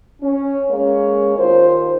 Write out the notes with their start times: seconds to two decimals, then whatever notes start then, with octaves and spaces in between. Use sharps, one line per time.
0.22 C#4
0.69 G#3 A#3 C#4 C#5
1.38 D#2 D#3 F4 C5